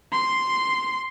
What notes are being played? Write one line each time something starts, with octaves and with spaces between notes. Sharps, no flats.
C6